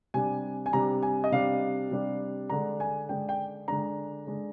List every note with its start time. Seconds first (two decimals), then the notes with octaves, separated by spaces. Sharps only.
0.14 C3 G3 D4 G#5
0.66 G#5
0.73 C3 G3 D4 A#5
1.03 G#5
1.24 D#5
1.32 C3 G3 D4 F5
1.91 C3 G3 D4
2.50 D3 G#3 D4 A#5
2.80 G#5
3.09 D3 G#3 D4 G5
3.29 G5
3.68 D3 G#3 D4 A#5
4.27 D3 G#3 D4